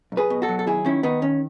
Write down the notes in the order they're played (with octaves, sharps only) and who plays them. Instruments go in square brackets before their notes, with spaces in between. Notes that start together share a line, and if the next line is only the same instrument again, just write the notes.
[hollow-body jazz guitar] B1
G#4 B4
B2
F#4 A4
F#3
A4
D#2 E4 G#4
D#3 C#4 E4
D#3 B3 D#4
D#2 C#4